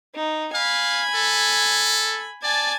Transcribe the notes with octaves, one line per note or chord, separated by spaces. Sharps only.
D#4
F5 G#5 B5
A4
D5 G#5 A5